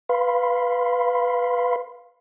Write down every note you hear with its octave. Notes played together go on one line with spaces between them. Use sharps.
B4 F5 B5 C6